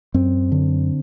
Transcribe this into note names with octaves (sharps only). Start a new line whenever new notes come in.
F#2 C4
D3